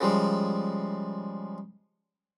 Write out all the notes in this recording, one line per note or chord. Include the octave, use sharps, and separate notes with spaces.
C#3 F3 G3 G#3